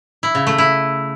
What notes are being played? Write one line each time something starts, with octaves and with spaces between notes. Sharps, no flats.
E4
C#3
A3
E4